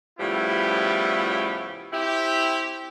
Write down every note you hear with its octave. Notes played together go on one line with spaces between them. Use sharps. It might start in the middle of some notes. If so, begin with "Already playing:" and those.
A2 C#3 F3 G3 B3 E4
C4 E4 G4